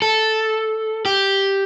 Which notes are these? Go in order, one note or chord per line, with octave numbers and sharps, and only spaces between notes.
A4
G4